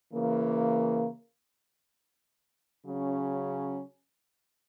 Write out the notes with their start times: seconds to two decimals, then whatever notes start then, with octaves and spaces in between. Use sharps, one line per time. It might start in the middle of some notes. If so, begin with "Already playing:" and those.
0.12 C#3 E3 A#3
2.85 C#3 F#3 C#4